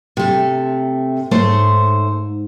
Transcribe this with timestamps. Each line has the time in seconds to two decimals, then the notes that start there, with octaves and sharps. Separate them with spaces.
0.17 C3 A3
1.31 G#2 A3 C5 C#5